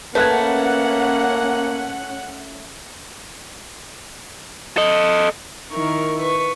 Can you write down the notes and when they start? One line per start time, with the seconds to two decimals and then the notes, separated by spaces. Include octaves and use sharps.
0.15 A3 A#3 C#4 B4 F#5 F#6 G#6
4.77 A4 D#5
5.71 D#3 E4 A#4 C#6
6.20 B4 C#6